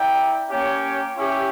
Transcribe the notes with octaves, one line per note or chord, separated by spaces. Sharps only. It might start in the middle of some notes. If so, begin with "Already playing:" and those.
Already playing: E4 A#4 D5 G5
A#3 C#4 G4 C#5 G5
C#4 E4 G4